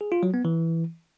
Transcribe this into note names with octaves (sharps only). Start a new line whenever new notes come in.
G#4
F4
F#3
B3
E3